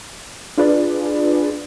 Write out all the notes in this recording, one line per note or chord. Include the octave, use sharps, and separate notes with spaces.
D4 F4 G#4 B4 D5